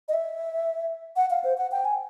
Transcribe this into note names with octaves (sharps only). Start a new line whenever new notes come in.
D#5
E5
F#5
F5
C5
F#5
G5
G#5